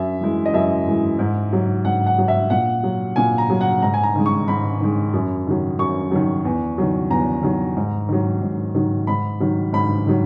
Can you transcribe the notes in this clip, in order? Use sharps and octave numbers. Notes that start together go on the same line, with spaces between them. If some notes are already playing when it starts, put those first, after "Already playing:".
Already playing: F#2 E5
E3 G#3
D#5
F#2 E5
E3 G#3
G#2
F#3
G#2 F#5
F#5
F#3
E5
A#2 F#5
F#3
A#2 G#5
A#5
F#3
F#5
G#2 A#5
G#5
A#5
D#3 G#3
C#6
G#2 B5
D#3 G#3
F#2
D#3 F#3
F#2 C#6
D#3 F#3
E2
D#3 F#3
E2 A#5
D#3 F#3
G#2
D#3 F#3
G#2
D#3 F#3
G#2 B5
D#3 F#3
G#2 B5
D#3 F#3